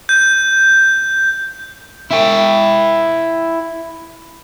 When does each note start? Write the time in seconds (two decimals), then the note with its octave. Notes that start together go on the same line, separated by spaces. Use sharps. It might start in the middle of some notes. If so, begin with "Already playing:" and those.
0.09 G6
2.11 E4 G5